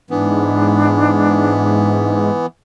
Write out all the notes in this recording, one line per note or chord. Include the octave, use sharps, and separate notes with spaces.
G#2 E3 B3 D4